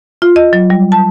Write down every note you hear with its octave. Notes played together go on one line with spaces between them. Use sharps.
F4
D#5
F#3
G3
A5